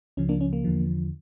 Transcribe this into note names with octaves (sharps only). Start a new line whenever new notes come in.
C#2 C#3 F3 C#4
A#3 D4
C#4
A#3
E2 D3 F3